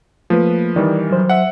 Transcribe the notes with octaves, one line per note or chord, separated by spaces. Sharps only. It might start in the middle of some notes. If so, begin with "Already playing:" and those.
F3 A3 A#3 B4
D#3 E3 G3 D5
F#3 C5
E5 F#5